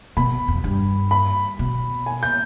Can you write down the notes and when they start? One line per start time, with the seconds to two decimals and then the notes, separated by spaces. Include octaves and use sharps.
0.17 B2 B5
0.48 F2
0.64 G2
1.11 B5
1.59 B2
2.06 G#5
2.23 G6